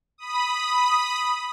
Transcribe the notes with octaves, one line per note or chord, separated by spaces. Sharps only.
B5 D#6